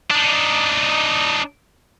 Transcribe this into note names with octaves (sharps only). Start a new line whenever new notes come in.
D4 D#4